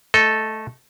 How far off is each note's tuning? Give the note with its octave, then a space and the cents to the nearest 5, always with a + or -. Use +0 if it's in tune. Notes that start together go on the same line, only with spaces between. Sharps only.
A3 -5 A4 -5 D#5 +15